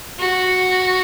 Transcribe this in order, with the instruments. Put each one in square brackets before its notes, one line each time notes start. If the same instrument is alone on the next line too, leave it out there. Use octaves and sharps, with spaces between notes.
[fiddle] F#4